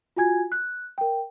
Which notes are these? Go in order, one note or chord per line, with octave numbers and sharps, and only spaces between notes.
F4 F#4 G#5 G#6
F#6
A#4 G5